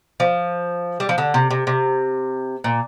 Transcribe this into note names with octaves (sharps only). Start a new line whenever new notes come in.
F3
G3
F3
D3
C3
C3
C3
A#2